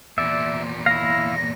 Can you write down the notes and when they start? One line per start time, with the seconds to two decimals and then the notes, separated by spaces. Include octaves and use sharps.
0.18 E2 A#2 D5 E5
0.86 E4 F5 A#6